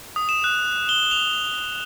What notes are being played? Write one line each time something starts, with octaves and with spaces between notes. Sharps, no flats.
D#6
E7
F#6
G7
F7